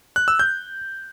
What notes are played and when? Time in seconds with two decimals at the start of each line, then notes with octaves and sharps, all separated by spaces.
0.16 F#6
0.28 E6
0.39 G6